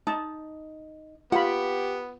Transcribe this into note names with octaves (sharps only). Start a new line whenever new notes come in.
D#4 A5
B3 F4 G4 F#5 B5